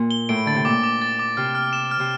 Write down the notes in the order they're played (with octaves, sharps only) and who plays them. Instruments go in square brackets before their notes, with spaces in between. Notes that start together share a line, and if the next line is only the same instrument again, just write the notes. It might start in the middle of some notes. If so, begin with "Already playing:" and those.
Already playing: [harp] A#2
[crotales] G7
[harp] A2 [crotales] D7
[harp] D3 [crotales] A6
[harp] C3
[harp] A#2 [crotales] D6
[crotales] D6
A6
D6
[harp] C3 [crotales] F6
[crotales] F6
E7
F6
[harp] C3